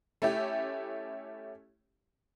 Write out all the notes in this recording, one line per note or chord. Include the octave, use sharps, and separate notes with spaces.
A3 C#4 E4 G4